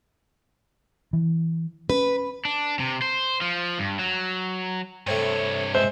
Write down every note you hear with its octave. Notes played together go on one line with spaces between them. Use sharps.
E3
C#4 B4
D4
C3
C5
F3
G2
F#3
G2 C3 A3 C4 C#5
G#3 C5 E5